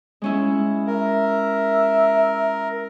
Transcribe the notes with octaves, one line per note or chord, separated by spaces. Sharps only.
G#3 C#4 E4
A#4 E5